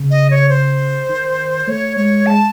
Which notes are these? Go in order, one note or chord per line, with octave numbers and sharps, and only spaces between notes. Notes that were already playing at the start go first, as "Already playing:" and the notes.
Already playing: C#3
D#5
C#5
C5
D#3
A3 C#5
G#3 C#5
G#3 A5